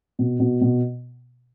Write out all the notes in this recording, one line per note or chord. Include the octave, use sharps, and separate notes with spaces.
B2
B2
B2